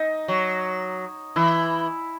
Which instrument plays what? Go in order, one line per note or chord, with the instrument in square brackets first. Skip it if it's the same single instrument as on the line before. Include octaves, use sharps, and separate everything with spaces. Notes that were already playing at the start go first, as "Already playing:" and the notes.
Already playing: [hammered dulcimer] D#4
[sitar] F#3
[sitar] E3 [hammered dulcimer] E4